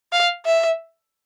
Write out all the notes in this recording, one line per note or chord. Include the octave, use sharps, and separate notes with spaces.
F5
E5